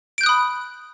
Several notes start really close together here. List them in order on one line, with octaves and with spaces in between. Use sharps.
D7 G6 F#6 D#6 B5